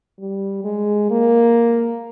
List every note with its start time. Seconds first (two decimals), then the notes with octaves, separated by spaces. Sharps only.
0.19 G3
0.64 G#3
1.10 A#3